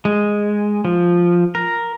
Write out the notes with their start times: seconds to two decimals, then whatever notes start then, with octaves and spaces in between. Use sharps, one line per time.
0.05 G#3
0.85 F3
1.55 A#4